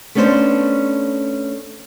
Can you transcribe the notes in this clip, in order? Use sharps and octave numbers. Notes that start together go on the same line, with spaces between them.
A3 B3 C#4 D4 C5